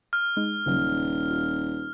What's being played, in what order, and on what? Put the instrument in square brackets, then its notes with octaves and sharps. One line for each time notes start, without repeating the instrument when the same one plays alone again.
[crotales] F6
[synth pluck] G#3 D#4
[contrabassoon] D#1 [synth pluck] C#3 F#3
[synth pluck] F4